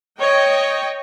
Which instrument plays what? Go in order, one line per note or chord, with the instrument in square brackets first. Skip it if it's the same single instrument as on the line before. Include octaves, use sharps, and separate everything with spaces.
[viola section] C#5 D#5 G5